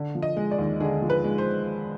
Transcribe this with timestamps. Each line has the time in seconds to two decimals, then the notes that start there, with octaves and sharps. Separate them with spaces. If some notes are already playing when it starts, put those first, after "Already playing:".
Already playing: D3
0.15 F3
0.22 D#5
0.36 G#3
0.51 D5
0.58 D#2
0.80 D3 G#4
1.02 F3
1.10 B4
1.24 G#3
1.38 C5